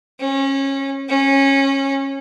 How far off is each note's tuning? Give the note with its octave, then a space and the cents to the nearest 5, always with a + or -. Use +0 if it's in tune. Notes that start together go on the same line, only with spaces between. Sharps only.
C#4 -25
C#4 -20